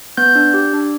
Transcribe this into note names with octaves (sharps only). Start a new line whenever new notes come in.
B3 G6
D4
G4
D4